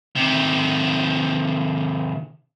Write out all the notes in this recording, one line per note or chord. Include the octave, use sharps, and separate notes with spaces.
C3 D#3